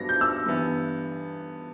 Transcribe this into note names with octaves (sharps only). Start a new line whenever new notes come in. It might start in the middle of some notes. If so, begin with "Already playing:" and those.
Already playing: G2 F#3 B3 A#6
G6
E6
G2 E3 B3